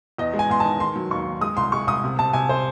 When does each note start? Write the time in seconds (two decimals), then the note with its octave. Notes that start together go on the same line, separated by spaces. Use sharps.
0.18 E2 D#5
0.34 G#3
0.39 G#5
0.50 E2 C6
0.60 D#3 A5
0.79 D#3 C6
0.96 F#3
1.11 D#2 C#6
1.26 D#3
1.41 G#3 D#6
1.57 C2 C6
1.72 G#3 C#6
1.87 C2 D#6
2.04 C3
2.19 C3 A5
2.33 C3 G#5
2.49 C5